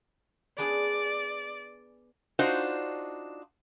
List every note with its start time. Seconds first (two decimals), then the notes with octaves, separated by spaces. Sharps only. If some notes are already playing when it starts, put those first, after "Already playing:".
0.58 B3 D4 G#4 D5
2.39 D4 D#4 F4 F#4 C5